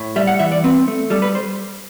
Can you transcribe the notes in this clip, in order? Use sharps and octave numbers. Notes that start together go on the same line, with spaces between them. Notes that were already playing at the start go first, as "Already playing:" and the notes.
Already playing: A2
G3 E5
F#5
E3 E5
D5
C4 B4
A3
G3 A4
B4
C5